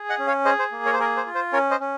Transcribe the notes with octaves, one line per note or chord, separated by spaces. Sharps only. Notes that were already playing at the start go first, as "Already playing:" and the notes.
Already playing: G#4
D#5 F#5
C#4
C#5 F5
G#4 C5 D#5
C5
A#3
A#4 C#5
C5
G#4 A#4
C5
F4
C5
C#4 A#4 C#5
C5 D#5
C#4